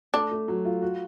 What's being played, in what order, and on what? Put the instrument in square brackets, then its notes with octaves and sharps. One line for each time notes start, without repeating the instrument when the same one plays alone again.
[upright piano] A3 [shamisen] D4
[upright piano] A3
F#3
F4
F#4